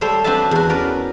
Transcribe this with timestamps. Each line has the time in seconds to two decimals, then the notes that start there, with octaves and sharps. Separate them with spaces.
0.01 G3 A3 A4 C5 C#5
0.24 C4 D4 F#4 B4 E5 A5
0.51 E2 F#4
0.69 C#4 A#4 B4 D5